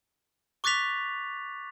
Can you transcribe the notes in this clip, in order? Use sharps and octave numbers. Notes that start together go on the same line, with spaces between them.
C#6 D6 F#6 A6 B6 F7